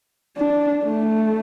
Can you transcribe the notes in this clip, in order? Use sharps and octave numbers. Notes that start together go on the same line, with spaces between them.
D4
A3